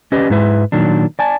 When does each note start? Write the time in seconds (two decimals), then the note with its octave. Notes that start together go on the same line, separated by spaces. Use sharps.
0.12 C#4 G4 B4 D5 D#5
0.30 G#2 G#3 E4 B4 E5
0.72 A#2 D#3 F#3 D4
1.19 D5 G#5 A5